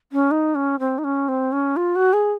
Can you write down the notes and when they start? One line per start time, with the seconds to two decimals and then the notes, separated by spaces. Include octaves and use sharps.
0.12 C#4
0.31 D#4
0.55 C#4
0.79 C4
0.98 D#4
1.04 C#4
1.28 C4
1.52 C#4
1.76 F4
1.96 F#4
2.13 G#4